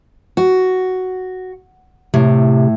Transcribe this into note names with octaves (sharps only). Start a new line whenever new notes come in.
F#4
A2 C3